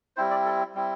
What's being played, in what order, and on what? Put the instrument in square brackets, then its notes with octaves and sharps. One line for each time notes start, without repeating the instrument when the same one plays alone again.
[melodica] G3 C4 E4 C5
D5
A4
G3 C4 E4